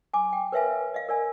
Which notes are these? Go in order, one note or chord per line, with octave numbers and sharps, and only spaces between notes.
G#5 D6
G5
A#4 B4 C#5 E5 F5 G#5
D#5 F5
A#4 D5 G#5